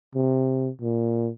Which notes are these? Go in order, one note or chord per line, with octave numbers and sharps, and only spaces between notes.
C3
A#2